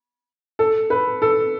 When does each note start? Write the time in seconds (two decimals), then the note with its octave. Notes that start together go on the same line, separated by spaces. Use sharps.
0.59 A4
0.90 B4
1.22 A4